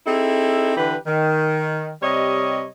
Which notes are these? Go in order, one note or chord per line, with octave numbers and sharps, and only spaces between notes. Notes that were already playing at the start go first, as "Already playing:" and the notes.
C4 D#4 E4 G#4 A4
D3 E3 G4 B4
D#3
C3 G3 C#5 D#5